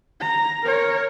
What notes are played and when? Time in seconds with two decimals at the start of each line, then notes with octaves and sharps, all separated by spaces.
0.21 A#5
0.63 A#4 C#5